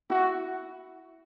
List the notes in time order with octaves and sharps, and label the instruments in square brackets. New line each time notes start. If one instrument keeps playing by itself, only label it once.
[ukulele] E4 [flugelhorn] F#4